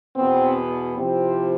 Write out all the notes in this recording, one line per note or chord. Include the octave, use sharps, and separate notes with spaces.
E2 B2 B3 C4
C3 F3 C4 E4 G4